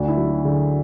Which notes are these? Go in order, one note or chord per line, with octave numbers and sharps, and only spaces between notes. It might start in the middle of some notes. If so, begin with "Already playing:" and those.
Already playing: D2 D4
E4
F#3
F#4
D3 G#4